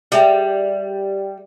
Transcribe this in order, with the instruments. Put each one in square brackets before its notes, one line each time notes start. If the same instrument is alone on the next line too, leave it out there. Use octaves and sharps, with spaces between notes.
[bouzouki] G3 [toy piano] G#4 E5 G5